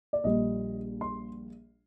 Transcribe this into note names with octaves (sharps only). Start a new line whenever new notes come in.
D5
A#1 A#2 G3 D#5
C6